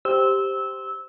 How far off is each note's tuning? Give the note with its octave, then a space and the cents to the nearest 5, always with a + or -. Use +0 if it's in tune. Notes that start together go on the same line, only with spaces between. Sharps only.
G4 +0 C5 +0 E6 -15